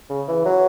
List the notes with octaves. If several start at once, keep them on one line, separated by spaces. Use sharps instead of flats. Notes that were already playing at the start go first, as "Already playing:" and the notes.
C#3
E3
F#3